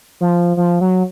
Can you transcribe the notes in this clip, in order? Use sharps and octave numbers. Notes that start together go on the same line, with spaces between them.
F3
F3
F#3